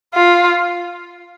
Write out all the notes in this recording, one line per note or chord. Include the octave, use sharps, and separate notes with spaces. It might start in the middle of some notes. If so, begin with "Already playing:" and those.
F4